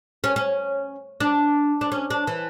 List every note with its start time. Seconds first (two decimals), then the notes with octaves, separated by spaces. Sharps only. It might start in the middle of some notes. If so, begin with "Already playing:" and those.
0.24 C#4
0.36 C#4
1.20 D4
1.81 D4
1.92 C#4
2.10 D4
2.27 E3